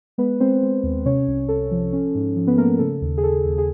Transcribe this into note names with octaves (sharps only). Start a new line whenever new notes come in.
G#3 B3 B4
G#3 C4 C5
G#3
D#2
C3 C#4 C#5
C2
C2 A4
F3
C#4
G#2
F3
B3 B4
A3 A#3 A#4
C#3 A4
D#2
G#4
D#2 A4
D#2
G#4